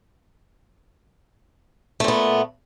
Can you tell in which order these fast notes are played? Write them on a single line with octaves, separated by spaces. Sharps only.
A3 A#2 B3